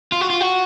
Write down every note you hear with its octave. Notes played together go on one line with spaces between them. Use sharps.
F4
F#4
F4
F#4